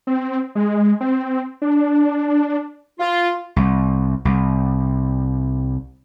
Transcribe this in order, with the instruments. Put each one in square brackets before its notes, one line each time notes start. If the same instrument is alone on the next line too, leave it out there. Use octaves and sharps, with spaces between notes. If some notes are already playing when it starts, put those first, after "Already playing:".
[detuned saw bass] C4
G#3
C4
D4
[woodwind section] F4
[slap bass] C2
C2